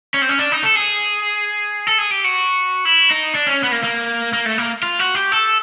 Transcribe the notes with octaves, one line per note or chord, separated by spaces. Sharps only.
C#4
C4
C#4
D4
D#4
A4
G#4
A4
G#4
G4
F#4
E4
D#4
D4
C#4
B3
A#3
A#3
A#3
A3
A#3
F4
F#4
G4
A4